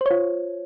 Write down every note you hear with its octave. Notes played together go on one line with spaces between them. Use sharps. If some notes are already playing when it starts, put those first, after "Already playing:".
F4 C5 C#5